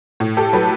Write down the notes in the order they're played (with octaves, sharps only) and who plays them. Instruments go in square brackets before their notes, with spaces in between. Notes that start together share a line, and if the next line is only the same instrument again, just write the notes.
[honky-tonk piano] A2
G4 A4
F#3 A4 B4